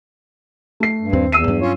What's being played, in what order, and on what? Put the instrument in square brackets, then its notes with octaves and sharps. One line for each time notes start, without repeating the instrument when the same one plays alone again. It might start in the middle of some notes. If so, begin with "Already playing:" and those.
[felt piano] A3 C7
[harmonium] G2
[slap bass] D#2 [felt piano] C4
[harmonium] E2 [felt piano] E6 C7 D#7
[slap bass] G2 F#3 D4
[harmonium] C#4 F4 C#5